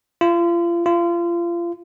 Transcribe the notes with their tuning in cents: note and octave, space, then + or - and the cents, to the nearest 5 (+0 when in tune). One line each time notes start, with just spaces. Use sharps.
F4 -35
F4 -30